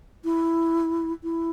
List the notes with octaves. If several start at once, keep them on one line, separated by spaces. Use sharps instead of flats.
E4
E4